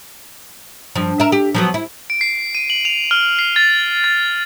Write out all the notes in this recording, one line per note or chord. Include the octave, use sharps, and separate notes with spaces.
G2 F3
A#4 E5
G4
F3 F#3 B3
E4
D7
C7
D#7
F#7
F7
F6
C7
A6
A6